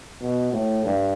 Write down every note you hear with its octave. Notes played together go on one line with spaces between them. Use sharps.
B2
A2
G2